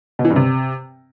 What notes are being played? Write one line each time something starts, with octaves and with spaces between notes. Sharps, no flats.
B2
E3
G2
C3